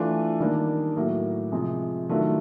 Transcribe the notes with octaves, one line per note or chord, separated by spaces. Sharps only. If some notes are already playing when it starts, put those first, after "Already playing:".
Already playing: E3 A3 D4 F4
D#3 G3 A#3 D4
A2 F#3 A#3
C3 F3 G#3
D#3 F#3 A3 D4 F4